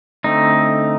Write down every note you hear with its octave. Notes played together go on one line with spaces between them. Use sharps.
D3 A3 C4 D#4